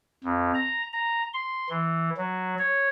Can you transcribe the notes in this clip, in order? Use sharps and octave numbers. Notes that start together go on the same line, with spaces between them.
F2
A#5
A#5
C6
E3
F#3
C#5